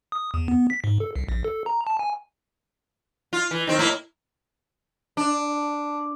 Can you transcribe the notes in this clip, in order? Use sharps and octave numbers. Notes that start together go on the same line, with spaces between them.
D#6
E2
B3
B6
G#2
A4
C2
A#1
A4
A#5
A5
G#5
F4
E3
D#3 C4
A2 A#3 E4
D4